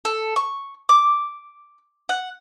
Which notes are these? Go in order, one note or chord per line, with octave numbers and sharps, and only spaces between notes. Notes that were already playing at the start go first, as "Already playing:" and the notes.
A4
C#6
D6
F#5